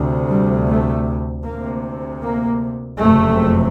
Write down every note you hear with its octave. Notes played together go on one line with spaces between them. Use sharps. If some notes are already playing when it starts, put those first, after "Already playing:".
Already playing: D2 C3
G3
A3
D2 C3 A#3
A#3
F#1 F2 C3 A3